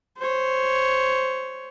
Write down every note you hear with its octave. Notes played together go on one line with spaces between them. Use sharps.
C5 C#5